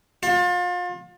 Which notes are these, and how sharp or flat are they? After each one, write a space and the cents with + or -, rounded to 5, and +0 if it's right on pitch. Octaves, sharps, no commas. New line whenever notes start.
F4 +35